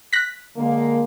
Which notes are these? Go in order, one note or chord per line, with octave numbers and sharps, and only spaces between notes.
F#6 A#6 B6
D3 G#3 A#3